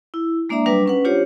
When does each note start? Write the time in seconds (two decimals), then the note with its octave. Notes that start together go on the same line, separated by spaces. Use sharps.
0.14 E4
0.49 G#3 A#3 D4 D5 E5 A#5
0.66 F#3 G3 D4 B4
0.86 C#4 B4 F#5
1.05 D4 F4 G4 C5 C#5